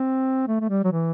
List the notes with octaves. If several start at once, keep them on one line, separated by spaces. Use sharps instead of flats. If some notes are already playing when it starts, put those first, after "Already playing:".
Already playing: C4
A3
A3
G3
F#3
E3